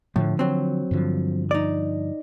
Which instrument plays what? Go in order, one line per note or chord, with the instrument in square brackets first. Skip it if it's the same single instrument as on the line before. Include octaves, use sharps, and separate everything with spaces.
[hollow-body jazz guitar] A2 [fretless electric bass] D3 F3
[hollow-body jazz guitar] F#3 C4
[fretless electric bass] G2 D3 F3
[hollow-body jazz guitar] D#4 D5